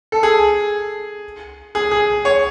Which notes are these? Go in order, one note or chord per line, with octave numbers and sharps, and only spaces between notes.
A4
G#4
G#4
G#4
C#5